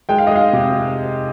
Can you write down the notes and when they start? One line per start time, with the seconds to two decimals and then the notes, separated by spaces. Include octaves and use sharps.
0.09 G#3 G5
0.18 F5
0.27 D#5
0.31 G#3 F5
0.53 C3